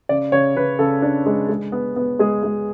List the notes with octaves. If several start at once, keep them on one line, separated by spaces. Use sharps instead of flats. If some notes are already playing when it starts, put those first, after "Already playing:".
C#3 D5
C#3 C#5
C#3 B4
C#3 A4
D4
G#3
G#3
B3
B3
G#3 G#4
G#3